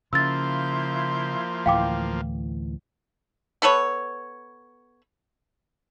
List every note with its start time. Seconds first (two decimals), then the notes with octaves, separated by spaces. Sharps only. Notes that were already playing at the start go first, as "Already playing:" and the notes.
0.13 C#3 F3 A#3 E4 C6 E6 G6 A6
1.66 D2 A2 E3 F5 G5 D6
3.62 B3 A4 B4 C#5